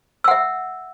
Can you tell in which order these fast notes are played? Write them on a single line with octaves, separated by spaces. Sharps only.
E6 F#5 E5